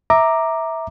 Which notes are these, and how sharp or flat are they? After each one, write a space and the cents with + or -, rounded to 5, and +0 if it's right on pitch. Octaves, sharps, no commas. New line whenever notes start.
E5 -15 A#5 +0 D6 +10